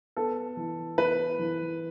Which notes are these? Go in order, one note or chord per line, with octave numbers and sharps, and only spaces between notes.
B3 A4
E3
B3 B4
E3